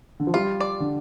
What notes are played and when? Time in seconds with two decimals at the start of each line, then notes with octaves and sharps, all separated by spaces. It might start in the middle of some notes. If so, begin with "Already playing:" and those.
0.20 D3
0.27 F3
0.34 G3 F4
0.60 D5
0.80 D3